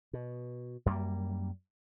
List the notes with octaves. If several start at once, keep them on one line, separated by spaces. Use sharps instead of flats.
B2
F#2 G3 A3 A#3